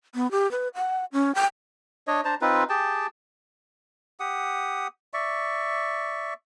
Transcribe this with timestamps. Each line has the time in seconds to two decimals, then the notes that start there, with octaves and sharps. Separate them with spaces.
0.15 B3
0.31 G4
0.51 B4
0.75 F#5
1.13 C#4
1.35 G5
2.07 D4 C#5 D#5
2.25 D4 C5 A5 A#5
2.41 C4 D#4 F4 B4
2.69 G4 G#4 G5 A5
4.20 G4 F#5 D#6
5.14 D5 E5 C#6